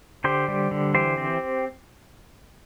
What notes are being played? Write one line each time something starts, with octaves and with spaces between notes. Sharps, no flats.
D3 G4 C5
G3
D3
E3 G4 C5
C4